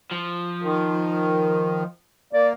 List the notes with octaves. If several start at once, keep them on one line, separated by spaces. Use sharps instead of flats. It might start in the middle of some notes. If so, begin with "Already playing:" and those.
F3
D#3
A#3 D5